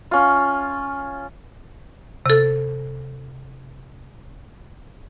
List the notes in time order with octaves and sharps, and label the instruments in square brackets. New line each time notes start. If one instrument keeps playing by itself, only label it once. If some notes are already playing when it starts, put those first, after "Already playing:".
[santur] C#4 F4
[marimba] C3 A4